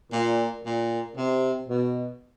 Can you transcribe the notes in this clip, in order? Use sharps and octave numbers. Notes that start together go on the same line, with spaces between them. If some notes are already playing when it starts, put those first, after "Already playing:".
A#2
A#2
C3
B2